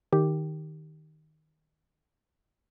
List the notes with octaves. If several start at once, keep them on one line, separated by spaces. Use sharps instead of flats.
D#3 G4